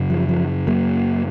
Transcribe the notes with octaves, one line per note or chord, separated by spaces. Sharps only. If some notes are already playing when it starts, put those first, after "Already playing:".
Already playing: F#2 C#3
F3
F3
F#3 A#3